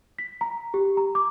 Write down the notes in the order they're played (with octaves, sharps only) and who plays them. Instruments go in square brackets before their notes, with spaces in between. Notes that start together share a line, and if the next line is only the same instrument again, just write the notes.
[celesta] B6
A#5
G4
A#5
D6